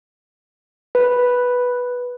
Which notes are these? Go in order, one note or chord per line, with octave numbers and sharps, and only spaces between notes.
B4